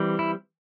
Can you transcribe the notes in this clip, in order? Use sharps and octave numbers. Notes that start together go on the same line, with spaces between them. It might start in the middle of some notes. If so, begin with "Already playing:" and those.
Already playing: E3 G3 C4
E4